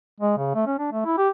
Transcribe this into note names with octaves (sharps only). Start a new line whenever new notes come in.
G#3
C#3
A3
C#4
D4
A3
E4
G4